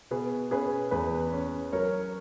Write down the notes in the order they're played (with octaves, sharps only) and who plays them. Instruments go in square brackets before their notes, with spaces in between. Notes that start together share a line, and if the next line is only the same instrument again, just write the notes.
[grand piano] B2 [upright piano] G#4 B4
[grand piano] C#4 [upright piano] G#4 B4
[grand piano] E2 [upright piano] G#4 B4
[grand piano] C#4
[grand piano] F#3 [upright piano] A#4 C#5